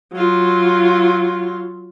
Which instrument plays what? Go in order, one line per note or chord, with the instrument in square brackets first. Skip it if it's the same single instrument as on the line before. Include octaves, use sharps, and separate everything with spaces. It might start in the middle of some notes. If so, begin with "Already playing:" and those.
[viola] F#3 F4